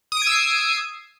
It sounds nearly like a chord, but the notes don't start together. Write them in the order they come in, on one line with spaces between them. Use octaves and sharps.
D#6 D7 G#6 E6 C7